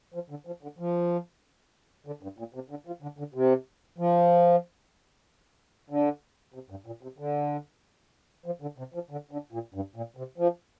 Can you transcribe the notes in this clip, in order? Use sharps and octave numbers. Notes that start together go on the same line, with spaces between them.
F3
D3
F3
D3
F3
D3
G2
A#2
C3
D3
F3
D3
D3
C3
F3
D3
C3
G2
A#2
C3
D3
F3
D3
C3
F3
D3
D3
A#2
G2
A#2
C3
F3